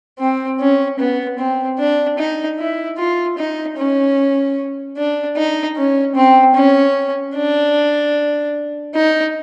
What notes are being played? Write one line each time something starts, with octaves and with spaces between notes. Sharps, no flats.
C4
C#4
B3
C4
D4
D#4
E4
F4
D#4
C#4
D4
D#4
C#4
C4
C#4
D4
D#4